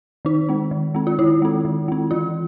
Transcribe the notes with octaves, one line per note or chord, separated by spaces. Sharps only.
D#3 D#4
G#3 C4
D#3
G#3 C4
F4
D#3 E4
G#3 C4
D#3
G#3 C4
E3 F4